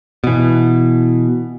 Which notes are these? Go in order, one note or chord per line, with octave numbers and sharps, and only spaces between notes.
B2 E3